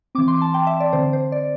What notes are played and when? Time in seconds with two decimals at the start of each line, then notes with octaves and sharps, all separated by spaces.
0.15 E3 C4 D6
0.28 C6
0.41 A5
0.54 G5
0.67 E5
0.80 D5
0.93 D3 C4 C5
1.13 C5
1.32 D5